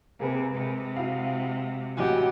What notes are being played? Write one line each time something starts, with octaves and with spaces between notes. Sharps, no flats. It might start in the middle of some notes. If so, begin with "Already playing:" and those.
C3 A#3 C4 G#4 B4
C3 G#3
E4 F#4 F5
A1 E3 F#4 G4 D#5 F#5 G#5